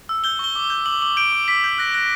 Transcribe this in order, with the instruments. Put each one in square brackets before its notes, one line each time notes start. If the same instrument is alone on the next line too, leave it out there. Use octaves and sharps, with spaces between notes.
[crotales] E6
G6 G7
C#6 G7
D6
G7
G6
D6 F#7
D6 F#7
G6 D7
D6
D6 B6
G6
F#6 A#6
F#6 A#6